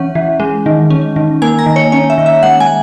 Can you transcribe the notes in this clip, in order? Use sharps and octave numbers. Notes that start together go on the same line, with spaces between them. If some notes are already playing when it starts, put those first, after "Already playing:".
Already playing: E3 C#4 F#5
E3
G#3
D#3
C#4
D#3
A#3 G#5
A#5
D#3
C#5
C#4 C#5
E5
D#3
E5
G#3 F#5
G#5